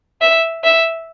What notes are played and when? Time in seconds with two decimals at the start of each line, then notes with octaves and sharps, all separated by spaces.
0.21 E5
0.64 E5